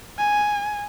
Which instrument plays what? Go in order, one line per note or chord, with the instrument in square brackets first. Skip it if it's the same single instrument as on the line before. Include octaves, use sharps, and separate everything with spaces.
[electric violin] G#5